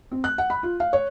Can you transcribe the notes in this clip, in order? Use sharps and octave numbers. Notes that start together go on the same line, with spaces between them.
C4
F#6
F#5
B5
F4
F5
C#5